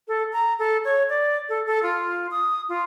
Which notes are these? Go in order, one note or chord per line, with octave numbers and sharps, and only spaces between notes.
A4
A#5
A4
C#5
D5
A4
A4
F4
D#6
F4